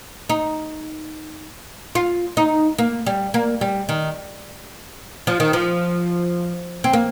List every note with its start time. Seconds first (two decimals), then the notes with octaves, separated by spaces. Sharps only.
0.29 D#4
1.95 F4
2.37 D#4
2.79 A#3
3.07 G3
3.34 A#3
3.61 G3
3.89 D#3
5.27 F3
5.40 D#3
5.53 F3
6.84 C4
6.93 A#3